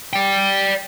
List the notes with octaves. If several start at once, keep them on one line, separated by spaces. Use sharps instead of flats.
D5 G5